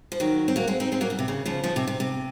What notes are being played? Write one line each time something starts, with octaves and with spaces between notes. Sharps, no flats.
F3
D#3 F#3
C4
F#3 A#3
G#3 C4
C4 D#4
G#3 C4
F#3 A#3
C#3
C3
C#3
C#3 F3
C#3 F3
C3
C3
C3